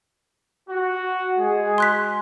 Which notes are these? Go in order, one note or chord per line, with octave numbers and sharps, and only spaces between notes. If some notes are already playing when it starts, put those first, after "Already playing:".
F#4
G#3 G#4
C6 F#6 B6